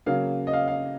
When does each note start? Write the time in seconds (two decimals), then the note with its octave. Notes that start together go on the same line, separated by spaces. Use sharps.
0.06 C#3 F#3 A#3 F5
0.47 D#5
0.53 F5
0.68 F5